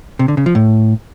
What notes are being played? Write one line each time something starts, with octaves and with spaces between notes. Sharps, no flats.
C3
D3
C#3
F3
A2